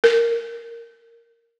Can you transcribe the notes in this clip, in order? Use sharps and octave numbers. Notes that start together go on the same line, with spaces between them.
A#4